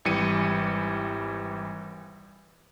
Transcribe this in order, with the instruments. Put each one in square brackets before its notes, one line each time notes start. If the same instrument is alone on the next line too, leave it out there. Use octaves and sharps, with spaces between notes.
[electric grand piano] G#1 E3 G3 C#7 D#7